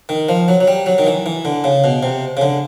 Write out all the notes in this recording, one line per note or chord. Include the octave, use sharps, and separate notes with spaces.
D#3
F3
F#3
F#3
G3
F#3
D#3
E3
E3
D3
C#3
B2
C3
C#3
D3